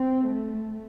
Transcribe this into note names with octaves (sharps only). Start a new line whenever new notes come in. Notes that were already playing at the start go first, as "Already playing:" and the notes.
Already playing: C4
A3